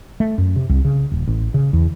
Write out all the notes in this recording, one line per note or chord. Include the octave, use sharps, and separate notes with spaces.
A3
F#2
C3
C2
C#3
D#1
A1
C#3
E2